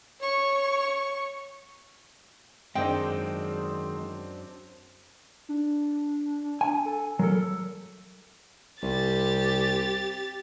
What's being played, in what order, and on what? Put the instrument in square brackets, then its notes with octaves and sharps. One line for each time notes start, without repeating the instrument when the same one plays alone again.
[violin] C#5 C#6
[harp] F#2 [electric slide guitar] D#3 G#3 [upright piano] C4 D4 [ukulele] D#5 G5
[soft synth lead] D4
[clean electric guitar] G#5
[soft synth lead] A4
[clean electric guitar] F#3 A4 [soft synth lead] A#4
[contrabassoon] C2 [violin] G4 A6